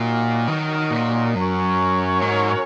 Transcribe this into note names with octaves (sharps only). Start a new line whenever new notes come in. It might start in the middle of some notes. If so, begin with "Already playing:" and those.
Already playing: A#2 F#3 D#4 F#4 A#4
D#3
A#2
F#2 F#3 C#4 A#4 C#5
G#2